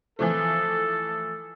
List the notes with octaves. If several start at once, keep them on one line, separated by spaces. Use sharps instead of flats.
E3 F3 A3 A4